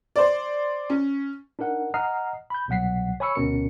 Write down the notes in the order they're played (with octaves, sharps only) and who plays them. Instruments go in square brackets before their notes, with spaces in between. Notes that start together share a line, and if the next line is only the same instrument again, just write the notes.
[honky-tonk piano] C5 D5
C#4
[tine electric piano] D4 D#4 A#4 F#5
D#5 F#5 A#5 D#6 F6 C7
B5 G6
C2 B2 F#3 F#5 B6 C7
C#5 G#5 B5 C#6 E6 C#7
D2 B2 C#4 A#4 C#7